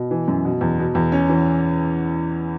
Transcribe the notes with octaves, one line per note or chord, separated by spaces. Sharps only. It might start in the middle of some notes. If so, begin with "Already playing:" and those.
Already playing: B2
E3
F#2
B2
E2
B2
E2
C#4
E3